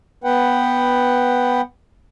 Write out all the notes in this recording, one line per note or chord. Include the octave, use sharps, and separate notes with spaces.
B3 B4 F#5 G5